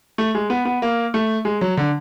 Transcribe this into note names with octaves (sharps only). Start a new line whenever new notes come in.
A3
G#3
B3
B3
A#3
A3
G#3
F#3
D3